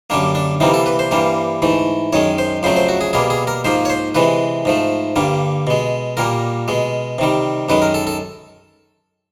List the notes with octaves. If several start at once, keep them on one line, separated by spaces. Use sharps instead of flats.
F#2 D3 G3 A#3 D4
D4
C3 E3 G3 A#3 D#4
A4
B4
C5
G2 E3 G3 A#3
G#2 E3 A3
F#2 D#3 G#3 C#5
C5
F2 C#3 F#3 A3 C5
C5
F#4
G#4
B2 G3 A#3 G#4
G#4
A#4
G#2 F3 A#3 C5
C#5
C5
C3 E3 G#3 B4
G#2 F3 A3
G2 D3 G3 A#3
B2 G#3
A#2 G3 A#3 A#4
B2 G#3
C3 D#3 G3
F#2 D#3 G#3 B4
A#4
A4
A4